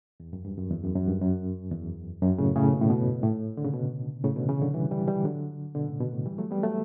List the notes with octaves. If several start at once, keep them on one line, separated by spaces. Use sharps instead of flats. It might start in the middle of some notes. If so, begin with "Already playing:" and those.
E2
F#2
G2
F#2
E2
F#2
F#2
G2
F#2
E2
F#2
A2 C#3
A2 C#3
B2
A2
B2
A2
D3
C#3
B2
A2 C#3
B2 D3
C#3 E3
D3 F#3
E3 G3
E3 G3
E3 G3
D3 F#3
B2 D3
A2 C#3
B2
A2
E3 G3
F#3 A3
G3 B3
F#3 A3